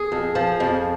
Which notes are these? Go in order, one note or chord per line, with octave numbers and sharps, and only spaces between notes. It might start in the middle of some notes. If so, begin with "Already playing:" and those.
Already playing: G#4
F2
F3
F2